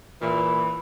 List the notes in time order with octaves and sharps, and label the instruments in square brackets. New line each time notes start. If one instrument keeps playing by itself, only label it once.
[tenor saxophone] A#2 [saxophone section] E3 [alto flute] B5